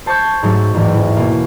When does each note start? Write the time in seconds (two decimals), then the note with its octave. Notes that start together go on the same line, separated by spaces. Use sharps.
0.06 C5 A5 C6 C#6 G6 G#6
0.43 G#2 F#3 A3 A6
0.74 A1 E2 G#2
0.94 E3 C#4
1.17 B2 A#3